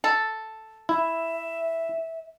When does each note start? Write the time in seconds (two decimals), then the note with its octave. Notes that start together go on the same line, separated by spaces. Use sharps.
0.04 A4
0.89 E4 E5